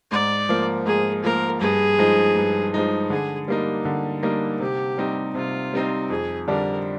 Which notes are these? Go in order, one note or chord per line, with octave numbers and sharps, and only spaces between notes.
G#2 D5
F3 A#3
G#2 G#4
F3 A#3 A#4
G2 G#4
F3 G#3 D#4
G2
F3 G#3 D#4
D3 G#4
G3 A#3 D#4
D3
G3 A#3 D#4
C3 G4
G3 C4 D#4
C3 F4
G3 C4 D#4
F2 G#4
D3 G3 D4 A#4